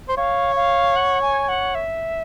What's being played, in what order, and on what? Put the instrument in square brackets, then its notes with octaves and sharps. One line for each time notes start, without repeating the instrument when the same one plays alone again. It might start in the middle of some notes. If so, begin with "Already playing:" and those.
[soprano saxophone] C5
[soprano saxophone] C#5 [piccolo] F5
[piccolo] F5
F#5
G#5
F#5
E5